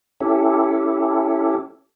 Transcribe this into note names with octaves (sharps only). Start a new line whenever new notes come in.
C#4 E4 G4 A4